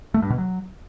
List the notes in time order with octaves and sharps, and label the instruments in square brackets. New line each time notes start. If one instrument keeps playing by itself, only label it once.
[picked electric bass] A3
G2
B2
F#3